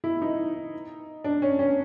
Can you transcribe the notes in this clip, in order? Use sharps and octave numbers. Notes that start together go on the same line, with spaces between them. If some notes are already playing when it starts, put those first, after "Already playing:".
E4
D#4
D4
C#4
C#4